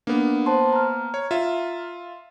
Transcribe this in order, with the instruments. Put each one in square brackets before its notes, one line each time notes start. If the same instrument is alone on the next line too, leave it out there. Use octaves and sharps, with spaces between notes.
[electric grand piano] A#3 B3 [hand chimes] D4 A#4
[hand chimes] C5 A5 C6
A#5 F6
[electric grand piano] C#5
F4 E5